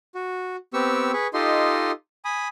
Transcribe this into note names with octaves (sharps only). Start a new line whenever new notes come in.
F#4
B3 C4 G4 C#6 E6
G#4 B4 C#6
D#4 F4 G4 A4 D#5 C6
G#5 B5 D#6